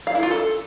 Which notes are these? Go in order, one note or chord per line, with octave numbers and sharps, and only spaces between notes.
F5
E4
F4
A4